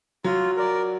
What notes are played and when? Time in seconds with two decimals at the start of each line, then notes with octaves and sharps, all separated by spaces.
0.24 F#3 F4
0.57 A#4 D5